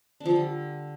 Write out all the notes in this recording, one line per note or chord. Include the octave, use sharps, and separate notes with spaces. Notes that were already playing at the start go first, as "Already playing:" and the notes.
D4
F3
D3
G3